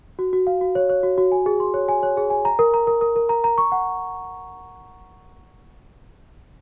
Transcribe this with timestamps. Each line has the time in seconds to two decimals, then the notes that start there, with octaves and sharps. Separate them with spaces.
0.19 F#4
0.33 F#4
0.47 F5
0.61 F#4
0.75 C#5
0.90 C#5
1.03 F#4
1.18 F#4
1.32 G#5
1.46 G#4
1.60 C6
1.74 C#5
1.89 G#5
2.03 C#5
2.17 G#4
2.30 G#5
2.45 A#5
2.59 A#4
2.74 A#5
2.87 A#4
3.01 A#4
3.16 A#4
3.29 A#5
3.44 A#5
3.58 C#6
3.72 F#5